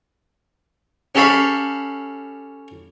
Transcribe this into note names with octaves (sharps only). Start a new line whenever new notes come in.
C#4 G4 A4 C#5 F5 B5